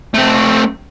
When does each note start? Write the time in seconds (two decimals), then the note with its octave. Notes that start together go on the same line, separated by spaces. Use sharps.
0.14 A3 C4